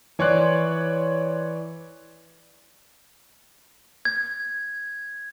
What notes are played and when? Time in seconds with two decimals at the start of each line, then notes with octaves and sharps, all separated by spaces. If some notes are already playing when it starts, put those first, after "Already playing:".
0.19 E3 C#5 D5 C6 F#6
4.05 G#6